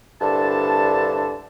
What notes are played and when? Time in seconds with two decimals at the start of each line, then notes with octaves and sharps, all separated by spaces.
0.20 C2 G2 D3 A5